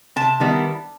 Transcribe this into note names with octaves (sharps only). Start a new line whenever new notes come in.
C3 A5
D#3 G3 B3 E4